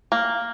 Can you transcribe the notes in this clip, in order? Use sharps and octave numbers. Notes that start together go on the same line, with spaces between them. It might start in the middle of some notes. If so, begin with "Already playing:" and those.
A#3